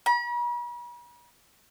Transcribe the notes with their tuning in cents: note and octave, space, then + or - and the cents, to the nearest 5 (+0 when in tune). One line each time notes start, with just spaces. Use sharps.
B5 -45